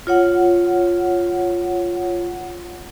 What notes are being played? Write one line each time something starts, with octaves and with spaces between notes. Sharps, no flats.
F4 C#5 F#5